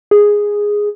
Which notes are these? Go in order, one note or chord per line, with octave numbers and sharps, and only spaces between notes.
G#4